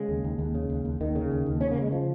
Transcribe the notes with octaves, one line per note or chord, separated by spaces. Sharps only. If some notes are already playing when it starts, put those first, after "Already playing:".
Already playing: C#3 G#3
D#2
D#2
D#2
C#3
D#2
D#2
D#2 D#3
C#3
D#2
D#2
C#3 C#4
A#3
C#3 G#3
F3